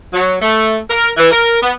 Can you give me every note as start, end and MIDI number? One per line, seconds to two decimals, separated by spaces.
0.13 0.36 54
0.40 0.77 57
0.90 1.09 70
1.17 1.30 52
1.32 1.59 70
1.62 1.71 59